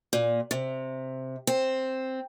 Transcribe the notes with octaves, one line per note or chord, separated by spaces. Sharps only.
A#2
C3
C4